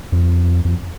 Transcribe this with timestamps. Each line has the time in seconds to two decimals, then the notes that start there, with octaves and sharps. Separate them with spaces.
0.12 F2
0.65 F2